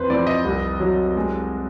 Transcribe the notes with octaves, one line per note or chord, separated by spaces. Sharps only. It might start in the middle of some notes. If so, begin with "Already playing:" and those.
Already playing: F2 B4 C5
F2 D5
D#5
C2
F#3
G#3